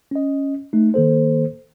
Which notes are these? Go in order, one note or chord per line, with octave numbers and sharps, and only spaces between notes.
C#4 D#5
A3 D#4
D#3 A#3 A4 C5